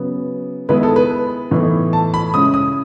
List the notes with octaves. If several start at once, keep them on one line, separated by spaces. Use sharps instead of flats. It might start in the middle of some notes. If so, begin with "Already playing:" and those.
Already playing: C#3 F#3 B3
D#3 G#3 B3 E4 B4
A4
B4
A2 E3 B3 D#4
A5
B5
C#3 G#3 C#4 E4 D#6
D#6